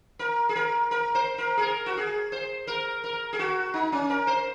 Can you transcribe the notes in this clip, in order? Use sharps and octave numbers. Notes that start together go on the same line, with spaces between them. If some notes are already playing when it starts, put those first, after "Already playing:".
A#4
G#4
A#4
A#4
C5
A#4
G#4
A#4
F#4
G#4
C5
A#4
A#4
G#4
F#4
D#4
C#4
A#4
C5